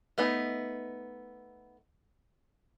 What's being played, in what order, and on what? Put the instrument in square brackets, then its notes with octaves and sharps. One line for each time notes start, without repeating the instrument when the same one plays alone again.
[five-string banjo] A3 B3 D#4